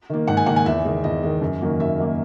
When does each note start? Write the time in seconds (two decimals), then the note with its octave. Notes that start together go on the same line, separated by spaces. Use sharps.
0.10 D#3 A#3
0.28 G#2 F#5
0.37 G#5
0.46 D#3 A#3 F#5
0.56 G#5
0.66 E2 E5
0.85 D#3 G#3
1.04 E2 D#5
1.23 D#3 G#3
1.41 F#2
1.61 D#3 F#3 A#3
1.80 F#2 E5
1.98 D#3 F#3 A#3